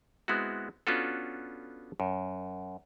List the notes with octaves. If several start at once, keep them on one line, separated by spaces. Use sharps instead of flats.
G#3 B3 C4 E4 F#4
B3 C#4 D4 F4 F#4 A4
F#2